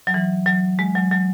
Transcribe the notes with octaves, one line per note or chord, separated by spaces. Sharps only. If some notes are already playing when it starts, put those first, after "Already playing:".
F#3
E3
F#3
G#3
F#3
F#3